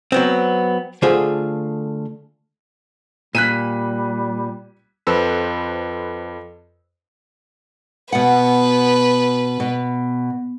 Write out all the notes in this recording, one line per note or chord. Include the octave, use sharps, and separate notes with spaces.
F#3 B3 C4
D3 A3 F4 G#4 C5
A#2 G3 F#6 B6 D#7
F2 A4 B4 C5 E6
B2 B4 F#5
B2